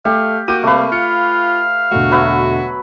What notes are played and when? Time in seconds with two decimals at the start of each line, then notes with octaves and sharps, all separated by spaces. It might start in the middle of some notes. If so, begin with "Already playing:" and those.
0.05 A3 G4 F5
0.48 A#3 F#4 G5 D6 D#7
0.63 C3 G3 A3 B4 F5
0.92 F4 F5 C#7
1.91 E1 D3 A3 F#4
2.11 F#3 B4 E5